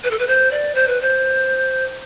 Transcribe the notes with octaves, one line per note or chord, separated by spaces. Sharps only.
B4
A4
B4
C5
D5
C5
B4
C5